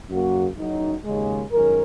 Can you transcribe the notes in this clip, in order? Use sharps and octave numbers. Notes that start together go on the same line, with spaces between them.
F#2 C#3 A#3 F#4
F#1 F#2 F#3 D#4
D#2 C#3 G#3
F#2 D#3 G#3 C#4 A#4